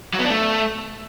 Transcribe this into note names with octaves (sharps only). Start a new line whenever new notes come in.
F#3
B3
D4
A3